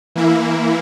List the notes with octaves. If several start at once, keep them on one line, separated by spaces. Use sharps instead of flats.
E3 A#3 E4